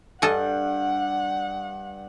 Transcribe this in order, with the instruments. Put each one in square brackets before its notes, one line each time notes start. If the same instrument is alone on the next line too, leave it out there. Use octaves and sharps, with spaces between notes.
[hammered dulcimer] G2 [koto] A4 D#5 G#5 [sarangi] F#5